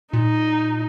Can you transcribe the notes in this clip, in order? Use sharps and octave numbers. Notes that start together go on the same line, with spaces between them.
A#2 D#4